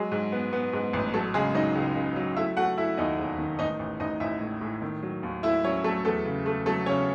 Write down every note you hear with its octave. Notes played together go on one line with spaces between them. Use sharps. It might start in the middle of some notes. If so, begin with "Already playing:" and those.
Already playing: F#3 G#3 G#4
G#2
B3
B3
G#2
A1
F#3 A3 A4
C#3 G#3 G#4
F#3 D#4 D#5
C#2
C#3
F#3
A3 E4 E5
A3 F#4 F#5
A3 E4 E5
D#2 D#4 D#5
E1
D#3
A1 D#4 D#5
A1
A1 D#4 D#5
A1 E4 E5
A2
A2
D#3
F#3
D#2
A3 E4 E5
F#3 C#4 C#5
F#3 A3 A4
E2 A3 A4
C#3
A3
F#3 A3 A4
C#3 C#4 C#5